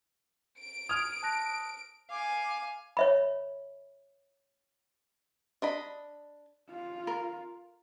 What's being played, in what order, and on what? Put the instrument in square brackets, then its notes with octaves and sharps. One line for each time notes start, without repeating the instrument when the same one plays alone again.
[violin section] D7
[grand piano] D#6 F6 [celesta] G#6 F7
[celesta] A5 F#6 A#6
[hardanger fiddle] F5 G#5 [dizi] D6
[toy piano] C#5 E5 B5
[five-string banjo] D4 D#5 B5
[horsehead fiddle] F4
[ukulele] A#4